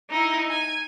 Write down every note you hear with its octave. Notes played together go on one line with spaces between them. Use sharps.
D#4 E4
G#5